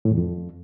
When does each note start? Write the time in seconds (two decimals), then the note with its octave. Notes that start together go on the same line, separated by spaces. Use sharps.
0.05 A2
0.11 E2
0.18 F2